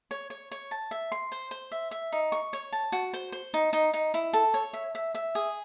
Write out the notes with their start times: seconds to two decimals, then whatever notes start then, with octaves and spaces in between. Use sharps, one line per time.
0.11 C#5
0.30 C#5
0.51 C#5
0.71 A5
0.91 E5
1.12 C6
1.32 C5
1.51 C5
1.72 E5
1.91 E5
2.12 D#4
2.32 C#6
2.53 C#5
2.72 A5
2.92 F#4
3.13 C5
3.32 C5
3.54 D#4
3.73 D#4
3.93 D#4
4.14 E4
4.33 A4
4.54 C#5
4.73 E5
4.95 E5
5.15 E5
5.35 G#4